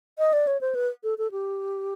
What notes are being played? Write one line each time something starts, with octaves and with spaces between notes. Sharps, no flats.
D#5
D5
C#5
C5
B4
A4
A4
G4